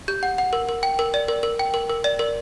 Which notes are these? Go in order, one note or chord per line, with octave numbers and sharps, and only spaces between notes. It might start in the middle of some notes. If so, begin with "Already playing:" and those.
G4 G6
F#5
F#5
A#4
A#4
G5
A#4
D5
A#4
A#4
G5
A#4
A#4
D5
A#4